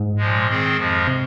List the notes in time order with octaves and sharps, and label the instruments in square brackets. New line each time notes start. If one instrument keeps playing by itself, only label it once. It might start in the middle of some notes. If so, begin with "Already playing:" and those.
Already playing: [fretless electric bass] G#2
[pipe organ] A#2 F3 G#3
D#3 C4 G#4
F2 F3 G#3
[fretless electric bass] C3